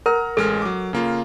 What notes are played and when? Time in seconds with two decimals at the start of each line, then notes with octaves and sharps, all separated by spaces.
0.06 A#4 F#5 A#5 F6
0.37 A1 G#3 A4 F6
0.62 F#3 D6
0.93 C#3 A#3 F4